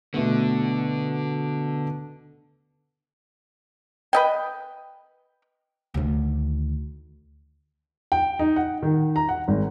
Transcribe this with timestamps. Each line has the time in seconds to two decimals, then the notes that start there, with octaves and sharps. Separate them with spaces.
0.14 B2 D3 A3 B3
4.13 B4 D#5 G5
5.94 D2 D#3
8.12 G5
8.39 D#4
8.56 F#5
8.82 D#3
9.16 A#5
9.29 F#5
9.48 G#1